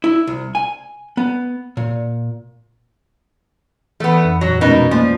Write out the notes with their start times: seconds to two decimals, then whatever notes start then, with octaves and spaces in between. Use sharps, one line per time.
0.04 E4
0.27 C2
0.55 G#5
1.17 B3
1.77 A#2
4.00 E3 A3 B3
4.24 F2
4.41 G2 A#2 F#3
4.61 B2 G#3 A3 C#4 D#4 A#4
4.91 F3 A3 A#3 D5